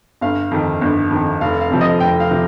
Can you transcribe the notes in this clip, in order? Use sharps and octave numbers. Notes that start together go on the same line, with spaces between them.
G1 F5
F2 D#3
G1
F2 D#3
F1 F5
F5
F2 C3 F3
D#5
F1 G5
F5
C3 F3